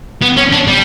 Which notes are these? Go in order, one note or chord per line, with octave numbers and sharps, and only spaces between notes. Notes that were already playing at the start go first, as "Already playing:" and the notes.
B3
C#4
D4
G3